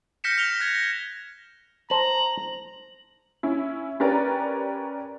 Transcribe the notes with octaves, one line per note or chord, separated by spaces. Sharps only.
F6 G6 A#6 B6 C#7 E7
F6 F7 G7
F#6 G#6 A#6
A#6
C5 A5 A#5 F#7
C#4 E4
C#4 G4 A#4 B4 D5 A#5